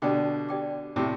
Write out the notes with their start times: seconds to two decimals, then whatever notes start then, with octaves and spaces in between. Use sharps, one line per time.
0.02 B2 D3 G4 D5 G5 D6
0.49 G4 D5 G5 D6
0.96 A2 C3 G4 D5 G5 D6